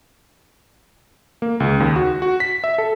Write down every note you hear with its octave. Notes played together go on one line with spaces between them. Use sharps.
A#3
C#2
D#2
F#4
F#4
B6
E5
A4